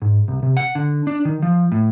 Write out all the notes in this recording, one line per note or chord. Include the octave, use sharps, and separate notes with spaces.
G#2
C2
C3
F#5
D3
D4
D#3
F3
A2